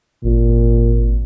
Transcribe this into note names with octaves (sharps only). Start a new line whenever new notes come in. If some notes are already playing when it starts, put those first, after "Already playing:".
G#1 A#2